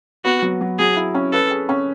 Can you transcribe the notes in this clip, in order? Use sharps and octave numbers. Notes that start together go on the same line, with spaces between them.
B3 F#4
F#3
F#3
F#3 G#4
E4
C#4
A4 B4
G#4
C#4